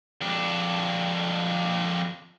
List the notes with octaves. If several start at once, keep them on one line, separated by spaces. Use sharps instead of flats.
F2 D4